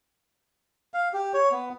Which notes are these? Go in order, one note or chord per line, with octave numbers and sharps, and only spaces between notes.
F5
G4
C#5
B3